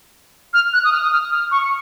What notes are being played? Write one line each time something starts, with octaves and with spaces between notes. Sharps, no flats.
F6
F#6
D#6
F6
D#6
F6
F6
C#6